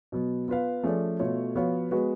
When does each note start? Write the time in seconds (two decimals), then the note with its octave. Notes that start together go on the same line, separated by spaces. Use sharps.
0.12 B2 F#3 B3
0.48 B3 F4 B4 F5
0.83 F3 A3 C#4 G#4 D5
1.20 B2 A3 F4 A4 C#5
1.55 F3 B3 F#4 C#5 F5
1.91 G#3 B3 F#4 B4